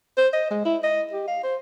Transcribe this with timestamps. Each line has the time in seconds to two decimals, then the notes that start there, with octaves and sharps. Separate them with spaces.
0.17 C5
0.33 D#5
0.51 G#3
0.65 E4
0.84 D#5
1.13 G4
1.27 F5
1.43 C5